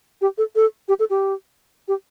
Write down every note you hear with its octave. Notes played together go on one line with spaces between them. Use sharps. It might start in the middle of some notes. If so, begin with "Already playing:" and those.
G4
A4
A4
G4
A4
G4
G4